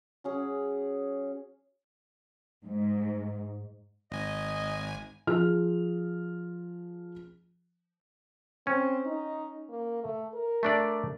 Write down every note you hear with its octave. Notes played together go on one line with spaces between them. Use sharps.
F#3 C#4 G#4
G#2
G#1 D#5 G#5
F3 F4 G#4 F6
C4 C#4
D#4
A#3
A3
A#4
A3 D4 D5